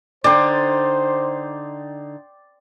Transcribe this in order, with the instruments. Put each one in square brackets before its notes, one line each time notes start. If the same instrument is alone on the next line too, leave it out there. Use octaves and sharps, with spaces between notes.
[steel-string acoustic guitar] D3 D#4 [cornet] C5 [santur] D5 G5 C6